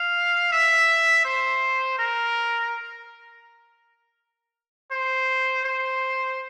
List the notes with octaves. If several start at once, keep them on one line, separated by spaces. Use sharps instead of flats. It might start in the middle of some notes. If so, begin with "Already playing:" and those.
Already playing: F5
E5
C5
A#4
C5
C5